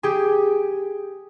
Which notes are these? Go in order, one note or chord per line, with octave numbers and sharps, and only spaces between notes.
G4 G#4